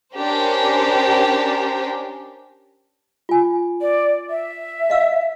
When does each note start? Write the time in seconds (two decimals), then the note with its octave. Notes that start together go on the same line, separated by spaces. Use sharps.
0.17 C#4 D4 G4 A#4 C5
3.29 F4 G#5
3.81 D5
4.30 E5
4.90 D#5 F5 E6